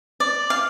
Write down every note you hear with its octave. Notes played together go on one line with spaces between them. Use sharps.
D5
F5